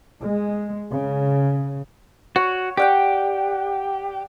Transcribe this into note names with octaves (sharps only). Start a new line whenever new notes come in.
G#3
C#3
F#4 C#5
G4 D5 F#5 G5